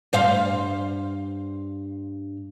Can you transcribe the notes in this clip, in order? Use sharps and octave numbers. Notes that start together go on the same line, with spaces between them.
G2 C5 F5